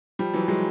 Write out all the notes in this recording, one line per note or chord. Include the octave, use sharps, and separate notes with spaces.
F3 G3
E3 F#3
F#3 G#3